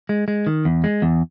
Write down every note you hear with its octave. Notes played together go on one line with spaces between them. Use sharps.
G#3
G#3
D#3
E2
G#3
E2